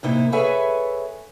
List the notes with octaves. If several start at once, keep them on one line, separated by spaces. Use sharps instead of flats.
A2 C3 A#3 D#4 E4
G#4 A4 B4 C#5 E5 G#5